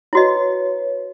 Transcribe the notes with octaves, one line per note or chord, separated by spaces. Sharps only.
E4 F#4 B4 C#5 D#5